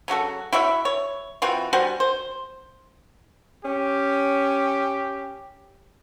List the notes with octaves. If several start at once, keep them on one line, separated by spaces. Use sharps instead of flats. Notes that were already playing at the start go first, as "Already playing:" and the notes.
C#3 F#3 F#4 A4
E4 F#4 C#5 E5
C#5
E3 C4 F4 F#4
G3 F#4 C5 G#5
C5
C#4 G4